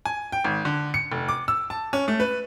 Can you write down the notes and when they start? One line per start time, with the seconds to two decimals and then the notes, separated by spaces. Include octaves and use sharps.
0.05 G#5
0.32 G5
0.44 G#1
0.65 D3
0.94 C#7
1.12 F1
1.28 D6
1.48 E6
1.70 A5
1.93 C#4
2.08 A3
2.20 B4